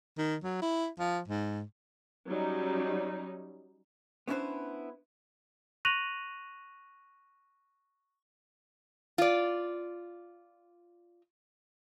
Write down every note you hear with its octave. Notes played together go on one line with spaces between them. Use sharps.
D#3
F#3
E4
F3
G#2
F#3 G3 C#4 D#4
B3 C#4 D4 E4 B4 C5
C#6 F#6 A#6 D#7 F7 F#7
F4 D5